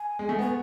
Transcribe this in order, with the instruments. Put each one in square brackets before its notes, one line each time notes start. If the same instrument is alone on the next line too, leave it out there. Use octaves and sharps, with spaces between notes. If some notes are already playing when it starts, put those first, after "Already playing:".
Already playing: [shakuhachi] G#5
[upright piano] G#3
A3
[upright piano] B3 [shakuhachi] G#5